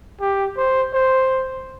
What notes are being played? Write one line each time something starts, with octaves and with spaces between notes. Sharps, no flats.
G4
C5
C5